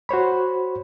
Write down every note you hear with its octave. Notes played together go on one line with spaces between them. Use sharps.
F#4 C5 C#5 B5